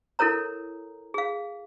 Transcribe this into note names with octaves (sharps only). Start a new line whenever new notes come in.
E4 A4 A#4 C#5 A#5
G#4 F5